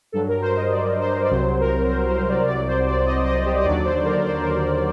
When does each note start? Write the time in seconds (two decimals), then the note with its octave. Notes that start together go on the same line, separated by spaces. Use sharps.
0.12 G2 F#3 A4
0.28 A#4
0.42 C5
0.56 D#5
0.71 D5
1.01 C5
1.24 D5
1.30 C2 C3 F#3 C5
1.60 A#4
1.89 C5
2.09 C5
2.29 D5
2.47 C2 C3 F#3 D5
2.68 C5
2.87 D5
3.06 D#5
3.25 D#5
3.45 G4
3.60 D#5
3.65 D#2 D3 F#3 D5
3.85 C5
4.05 A#4
4.24 C5
4.43 A#4
4.63 A#4